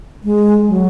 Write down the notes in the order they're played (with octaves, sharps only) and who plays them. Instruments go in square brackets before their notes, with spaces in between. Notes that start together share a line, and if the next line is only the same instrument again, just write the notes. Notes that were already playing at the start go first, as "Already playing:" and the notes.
[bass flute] G#3
F#3